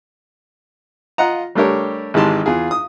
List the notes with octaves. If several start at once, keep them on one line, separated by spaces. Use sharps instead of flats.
F4 D#5 F#5 A#5
G3 A3 D4 G4 A#4 C#5
G#1 E3 G#3 G4 A5 C6
E2 F4 G#4
D#6